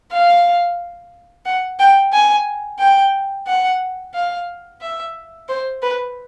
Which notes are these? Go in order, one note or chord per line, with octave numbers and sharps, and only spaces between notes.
F5
F#5
G5
G#5
G5
F#5
F5
E5
C5
B4